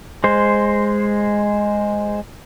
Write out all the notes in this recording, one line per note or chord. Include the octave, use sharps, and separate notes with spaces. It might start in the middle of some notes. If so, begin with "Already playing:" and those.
G#3 C5